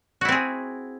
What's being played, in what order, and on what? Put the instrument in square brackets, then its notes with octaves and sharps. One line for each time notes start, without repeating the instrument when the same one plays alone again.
[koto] F#4
E4
C4
G#4